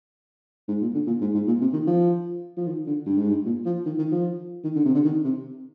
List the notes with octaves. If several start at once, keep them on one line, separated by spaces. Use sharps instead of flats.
G#2
A#2
D3
A#2
G#2
G#2
A#2
C3
D#3
F3
F3
D#3
D3
G2
G#2
G2
A#2
F3
D#3
D#3
F3
D#3
D3
C3
D3
D#3
C3